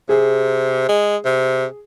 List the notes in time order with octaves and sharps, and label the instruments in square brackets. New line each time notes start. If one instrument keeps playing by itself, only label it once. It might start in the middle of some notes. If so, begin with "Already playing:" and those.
[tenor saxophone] C3 [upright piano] G#4
[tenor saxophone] G#3
C3